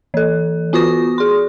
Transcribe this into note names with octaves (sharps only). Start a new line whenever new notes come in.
E3 A4
B3 F4 F#4 C#6 D#6 A#6
G#4 C6